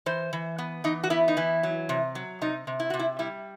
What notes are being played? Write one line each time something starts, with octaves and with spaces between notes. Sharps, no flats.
E3 C5
E3
B3
E3 D#4
F#4
B3 E4
D#4
E3 E4
F#3
C3
F#3
C3 D#4
C3
E4
C3 F#4
E4
G3 E4